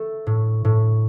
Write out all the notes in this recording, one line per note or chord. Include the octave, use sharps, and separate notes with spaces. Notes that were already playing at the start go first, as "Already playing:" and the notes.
Already playing: A3 A4
A2
A2